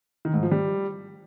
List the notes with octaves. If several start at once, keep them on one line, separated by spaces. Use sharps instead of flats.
D#3
G#2
F3
G3